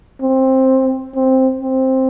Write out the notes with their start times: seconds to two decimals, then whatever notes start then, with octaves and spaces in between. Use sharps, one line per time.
0.21 C4
1.15 C4
1.61 C4